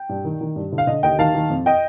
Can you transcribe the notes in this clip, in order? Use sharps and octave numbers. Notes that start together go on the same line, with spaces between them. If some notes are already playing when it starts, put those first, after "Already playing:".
Already playing: G5
G2
D#3
D#3
G2
D3
F5
D3 D#5
D#2 D#5 G5
D#3 F5 A5
D#3
F2
D#5 G5